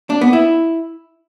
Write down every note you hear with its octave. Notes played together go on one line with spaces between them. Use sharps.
D4
B3
E4